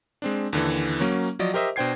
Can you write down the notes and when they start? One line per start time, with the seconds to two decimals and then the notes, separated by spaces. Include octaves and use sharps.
0.22 G#3 C4 D4
0.53 D#2 D3 E3
1.00 F#3 A#3 C#4
1.39 F3 F#3 D5 D#5
1.54 G4 A#4 C5 D#5 E5
1.76 B2 D4 C5 G5 G#6 C7